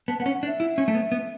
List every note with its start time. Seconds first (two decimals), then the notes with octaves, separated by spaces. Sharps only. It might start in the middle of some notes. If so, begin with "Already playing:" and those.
0.08 B3 A5
0.20 B3 F#5
0.26 C#4
0.34 F#5
0.43 D4
0.47 E5
0.60 E4
0.78 C#4
0.88 A3
0.95 B3
1.12 B3